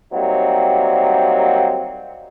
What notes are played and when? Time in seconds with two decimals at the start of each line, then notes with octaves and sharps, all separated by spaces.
0.13 F#3 G3 A#3 C4 D#4